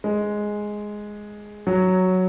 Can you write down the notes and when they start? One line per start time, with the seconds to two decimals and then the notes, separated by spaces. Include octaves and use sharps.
0.04 G#3
1.67 F#3